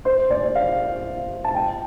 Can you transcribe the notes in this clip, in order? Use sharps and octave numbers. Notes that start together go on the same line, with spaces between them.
C5
D5
F5
A5
G5